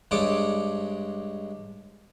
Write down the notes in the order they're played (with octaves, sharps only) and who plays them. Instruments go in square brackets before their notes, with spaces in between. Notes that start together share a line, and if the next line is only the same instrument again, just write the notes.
[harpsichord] G2 G#3 C#5 D5 D6 D#6